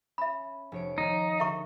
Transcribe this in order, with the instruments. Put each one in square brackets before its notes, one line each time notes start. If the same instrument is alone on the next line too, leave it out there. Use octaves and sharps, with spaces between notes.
[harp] C#4 [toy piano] E5 B5
[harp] F1 C#5 D7
[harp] D#2 [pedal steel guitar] D#4
[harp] D3 A#4 F#5 [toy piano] E5 A#5 C#6